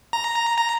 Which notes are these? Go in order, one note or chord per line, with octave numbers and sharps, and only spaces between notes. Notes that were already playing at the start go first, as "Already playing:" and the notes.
A#5
A#5